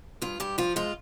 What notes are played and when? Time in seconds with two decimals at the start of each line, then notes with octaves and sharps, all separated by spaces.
0.22 G2 F4
0.40 G2 G4
0.58 F3 F4
0.76 G#3 F4